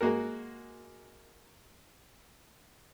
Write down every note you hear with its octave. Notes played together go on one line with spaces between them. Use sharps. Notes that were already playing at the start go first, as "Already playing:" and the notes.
G#3 A#3 F#4 A#4